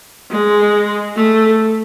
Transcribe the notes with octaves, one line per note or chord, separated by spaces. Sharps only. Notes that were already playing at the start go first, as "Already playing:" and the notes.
G#3
A3